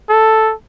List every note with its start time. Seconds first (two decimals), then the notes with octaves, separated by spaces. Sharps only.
0.09 A4